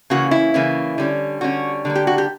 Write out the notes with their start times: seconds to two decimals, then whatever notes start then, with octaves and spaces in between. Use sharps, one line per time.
0.10 C#3 E3 A#3 C#4 F#4
0.31 E4
0.54 C#3 E3 A#3 C#4
0.98 D3 G3 C#4
1.41 D3 G3 C#4 F#4
1.85 D3 G3 A#3
1.95 G4
2.07 F#4
2.18 G4